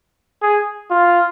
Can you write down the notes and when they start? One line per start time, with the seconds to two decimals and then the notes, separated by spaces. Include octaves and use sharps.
0.42 G#4
0.91 F4